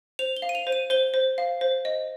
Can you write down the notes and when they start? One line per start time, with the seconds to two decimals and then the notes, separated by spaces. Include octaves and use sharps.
0.19 C5 F7
0.37 G7
0.42 F5
0.49 D#7
0.55 F7
0.67 C5
0.72 D#7
0.90 C5 G7
1.14 C5
1.38 F5
1.61 C5
1.85 D#5